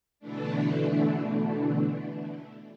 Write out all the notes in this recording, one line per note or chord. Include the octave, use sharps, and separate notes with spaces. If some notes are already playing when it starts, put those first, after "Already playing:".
B2 D3 E3 A3 D4